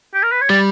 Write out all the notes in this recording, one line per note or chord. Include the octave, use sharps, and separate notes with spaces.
G4
A#4
B4
C#5
G3 D5